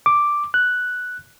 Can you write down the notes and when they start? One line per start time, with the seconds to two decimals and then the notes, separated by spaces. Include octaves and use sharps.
0.06 D6
0.54 F#6